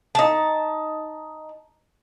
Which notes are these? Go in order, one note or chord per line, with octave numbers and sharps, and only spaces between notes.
D#4 A5